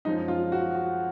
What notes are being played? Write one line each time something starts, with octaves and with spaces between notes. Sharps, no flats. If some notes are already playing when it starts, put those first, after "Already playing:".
F#2 F3 G#3 D#4
F4
F#4
F#4